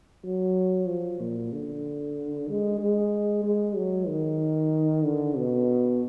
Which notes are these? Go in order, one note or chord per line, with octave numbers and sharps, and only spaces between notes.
F#3
F3
A#2
D3
G#3
G#3
G#3
F#3
D#3
D3
B2